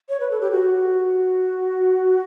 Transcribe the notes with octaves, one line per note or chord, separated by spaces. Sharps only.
C#5
B4
A4
G4
F#4